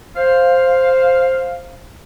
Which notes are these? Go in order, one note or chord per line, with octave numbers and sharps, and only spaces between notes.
C5 F5